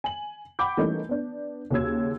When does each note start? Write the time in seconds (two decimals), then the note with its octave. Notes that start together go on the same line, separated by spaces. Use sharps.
0.04 G#5 F#7
0.59 F#5 G5 B5 D6 G6
0.77 E3 G3 A3 A#3 C#4 D#4
1.09 B3 D4
1.70 D#2 C#3 F#4 C#5 E6 G#6